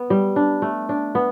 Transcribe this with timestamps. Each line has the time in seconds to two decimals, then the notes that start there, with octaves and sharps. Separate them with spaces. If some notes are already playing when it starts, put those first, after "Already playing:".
Already playing: B3
0.10 G3
0.36 D4
0.62 A3
0.89 D4
1.15 B3